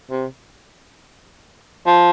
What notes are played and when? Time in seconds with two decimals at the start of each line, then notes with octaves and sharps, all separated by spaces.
0.10 C3
1.86 F3